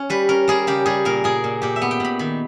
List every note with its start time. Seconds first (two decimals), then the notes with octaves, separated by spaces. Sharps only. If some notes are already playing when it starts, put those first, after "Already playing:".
Already playing: C#4
0.10 G3 B4
0.29 C#4 A#4
0.48 G3 G#4
0.67 C#3 G4
0.86 G3 G#4
1.05 A#2 A#4
1.24 A#2 G#4
1.44 A#2
1.62 A#2 G4
1.76 E5
1.82 B3
1.91 G5
2.00 A#2 B5
2.19 D#3 B5